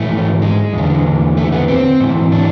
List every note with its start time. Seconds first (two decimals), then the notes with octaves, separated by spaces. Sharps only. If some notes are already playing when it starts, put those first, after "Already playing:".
Already playing: G#2 E3 A3
0.42 G#3
0.73 E2 D3
1.37 A3
1.52 B3
1.68 C4
2.00 G#2 E3
2.32 D4